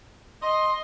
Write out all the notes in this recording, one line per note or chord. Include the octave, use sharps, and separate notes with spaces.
D#5 C6